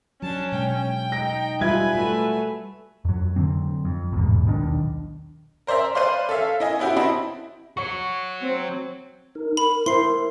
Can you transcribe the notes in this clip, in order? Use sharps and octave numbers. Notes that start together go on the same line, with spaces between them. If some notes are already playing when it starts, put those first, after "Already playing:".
F#3 C#4 D4 A5
B2 G#3 G5
D#4 A#6
G3 F4 B4 E5 G#5 G#6
A3 F#4
F2 F#3
D3 F#3 C4
F2
A1 E2 G#2 B2
D#1 B1 D#3 D4
A#4 C5 D5 E5 A#5
B4 C5 D5 F5 C6
A4 C#5 E5 F5
E4 D#5 G#5
B3 C#4 E4 F#4 G4
C4 E4 D#5 A5 B5
F#4 C#5 C#6
C4
D#4 A#4
A#4 B5
E4 C5 C6 C7